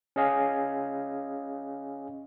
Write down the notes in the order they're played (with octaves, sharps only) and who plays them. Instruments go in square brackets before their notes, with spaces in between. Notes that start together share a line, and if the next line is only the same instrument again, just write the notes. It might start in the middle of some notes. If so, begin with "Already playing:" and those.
[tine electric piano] C#4 G#4 D#5 F5 G#5